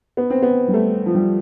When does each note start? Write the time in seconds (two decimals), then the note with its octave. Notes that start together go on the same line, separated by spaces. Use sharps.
0.17 B3
0.30 C4
0.42 B3
0.68 G3
0.74 A3
1.06 F3
1.15 G3